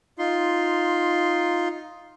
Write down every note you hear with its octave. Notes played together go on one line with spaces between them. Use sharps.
D#4 F4 C6